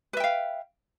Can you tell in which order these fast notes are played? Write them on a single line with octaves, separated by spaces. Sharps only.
B4 E5 G5 F5